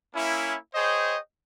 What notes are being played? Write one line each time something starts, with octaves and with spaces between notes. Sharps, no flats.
A#3 C#4 E4
G#4 C5 C#5 D#5 G5